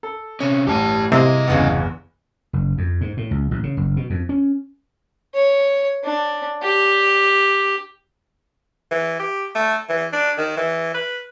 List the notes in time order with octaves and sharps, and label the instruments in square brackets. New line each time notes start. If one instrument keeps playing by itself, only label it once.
[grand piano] A4
[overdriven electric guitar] C3 C#4 [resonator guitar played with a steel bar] C#5
[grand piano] A1 A2 D#7 [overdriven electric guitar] G4 A5
[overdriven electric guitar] G2 D#5 [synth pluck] C3 [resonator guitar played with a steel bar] G#3 A#3 E4
[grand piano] G1 E2 [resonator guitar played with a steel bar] C#3 E3 B3
[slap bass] F#1
F2
G#2
A2
C#2
A1
C#3
F#1
B2
F2
C#4
[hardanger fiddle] C#5
D4
G4
[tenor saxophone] E3
G4
A3
E3
D4
D#3
E3
B4